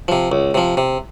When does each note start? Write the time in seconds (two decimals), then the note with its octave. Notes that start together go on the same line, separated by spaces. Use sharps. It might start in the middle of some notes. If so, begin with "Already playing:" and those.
0.08 C3 F3
0.32 C#2
0.54 C3 F3
0.77 C3